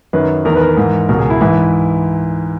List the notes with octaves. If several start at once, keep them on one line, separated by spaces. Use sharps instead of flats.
F#2 D#3 B4
E2 D#3 A#4
B4
A#4
G#2 E3
C#2 B2 A#4
G#4
E4
G#2 E3 E4